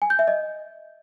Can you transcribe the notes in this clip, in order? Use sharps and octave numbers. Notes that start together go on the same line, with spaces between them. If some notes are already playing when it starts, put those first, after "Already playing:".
G#5
G6
E5
D#5